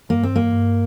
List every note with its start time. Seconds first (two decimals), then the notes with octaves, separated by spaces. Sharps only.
0.09 G2 A#3
0.23 C4
0.36 A#3
0.52 G2